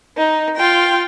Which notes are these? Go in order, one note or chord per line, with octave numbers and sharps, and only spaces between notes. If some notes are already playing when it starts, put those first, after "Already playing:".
D#4
F4 G5